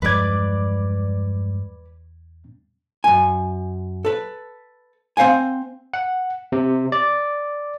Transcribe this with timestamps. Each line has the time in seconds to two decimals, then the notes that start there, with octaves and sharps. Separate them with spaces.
0.02 E2 G2 F3 G#3 B4 D5 G#6
3.04 F#2 G#5
4.05 A4 B4
5.17 C4 C5 F5 F#5 G#5
5.94 F#5
6.52 C3
6.92 D5